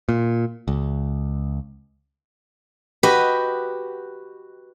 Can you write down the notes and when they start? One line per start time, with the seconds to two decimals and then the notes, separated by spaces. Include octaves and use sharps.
0.09 A#2
0.68 C#2
3.03 F#4 G4 B4 D#5